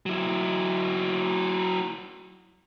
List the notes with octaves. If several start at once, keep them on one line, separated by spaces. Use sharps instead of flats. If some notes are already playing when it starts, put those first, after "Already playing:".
F#3 E4